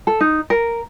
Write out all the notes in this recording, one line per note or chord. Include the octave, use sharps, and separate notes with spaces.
A4
D#4
A#4